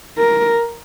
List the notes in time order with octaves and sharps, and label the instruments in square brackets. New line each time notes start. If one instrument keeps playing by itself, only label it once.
[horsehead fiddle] A#4